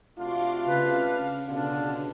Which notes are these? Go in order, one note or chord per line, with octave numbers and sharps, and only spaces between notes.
C3 A3 D4 F4 F#4 F5 C6 D6
C#3 B4
B2 D3 D4 F4 F5